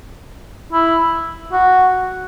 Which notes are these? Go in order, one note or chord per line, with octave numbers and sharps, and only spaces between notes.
E4
F#4